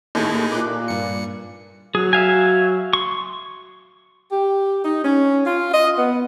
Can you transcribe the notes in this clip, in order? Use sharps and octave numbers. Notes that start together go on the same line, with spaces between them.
D#2 A2 D#4 E4 G#4
A#2 D6 F#6
G2 C#7
F#3 G#4
E5 F5 G#5
C6 C#6
G4
D#4
C#4
F4
D#5
B3